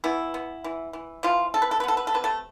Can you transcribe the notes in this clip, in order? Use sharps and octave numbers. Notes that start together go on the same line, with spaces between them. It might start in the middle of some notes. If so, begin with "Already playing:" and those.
E3 B3 E4
B3
E3
E3
E3 F3 F4
C3 A4
B4
A4
B4
B3 A4
B4
A4
C3 B4
A3 A4